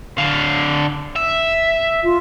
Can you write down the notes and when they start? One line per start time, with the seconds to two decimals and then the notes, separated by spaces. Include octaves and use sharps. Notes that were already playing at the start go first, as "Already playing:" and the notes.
0.18 D3 F5
1.16 E5
2.03 F4